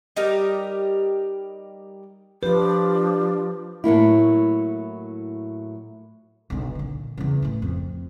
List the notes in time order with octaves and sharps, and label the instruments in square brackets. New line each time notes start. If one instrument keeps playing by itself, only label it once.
[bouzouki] G3 D#4 G4 A#4
[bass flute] F3 [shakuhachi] D4 [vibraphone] G4 [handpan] B4
[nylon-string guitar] A2 F#3 A#3 E4
[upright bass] B1 D3
A#2 D3
E2 C#3
A2 E3
F2